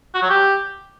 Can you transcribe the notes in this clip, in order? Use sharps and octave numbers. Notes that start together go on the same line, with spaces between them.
F#4
F#3
G4